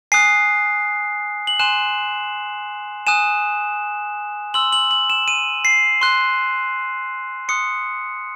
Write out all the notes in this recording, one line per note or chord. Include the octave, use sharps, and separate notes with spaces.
G#5 D#6 F#6 C7
F#7
G#5 C6 F#6 E7
G#5 D#6 F#6 E7
C6 E6 F#7
F#7
F#7
E7
D#7
C7
C6 F#6
C6 D#6 F#6 C#7